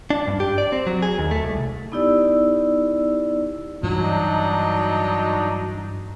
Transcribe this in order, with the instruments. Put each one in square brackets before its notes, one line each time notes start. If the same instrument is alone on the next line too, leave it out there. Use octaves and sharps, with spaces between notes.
[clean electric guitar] D4
G2
G4
D5
C4
F#3
G#4
D#2
A3
C2
[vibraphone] B3 D#4 E4 G4 D5 E6
[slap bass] G2 E3 [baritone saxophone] F#3 [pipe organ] D4 D#4